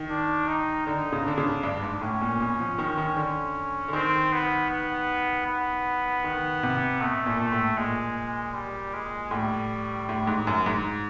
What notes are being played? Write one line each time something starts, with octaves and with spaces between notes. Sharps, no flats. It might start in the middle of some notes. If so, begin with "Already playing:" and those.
Already playing: D#3
D4
D#4
D3 D#4
C#3
D3 D4
C#3
G2 D4
G#2
A2 C#4
A#2
B2
F3
D#3
D#3
D3
D3
D#3 C4
B3
B3
B3
D#3
C3
B2 A3
A#2
A3
A2
A#2 G#3
G3
G#3
A2 G3
A2
G#2
F#2
G#2